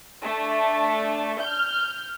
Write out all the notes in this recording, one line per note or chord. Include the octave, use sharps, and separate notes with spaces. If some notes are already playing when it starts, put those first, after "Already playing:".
A3 D4
F6 G6